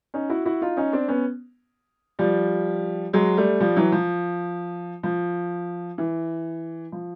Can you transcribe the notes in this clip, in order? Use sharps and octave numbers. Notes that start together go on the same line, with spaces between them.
C#4 D#4
E4 F#4
E4 F#4
D#4 F4
C#4 D#4
C4 D4
B3 C#4
F3 G3
F#3 G#3
G3 A3
F3 G3
E3 F#3
F3
F3
E3
F3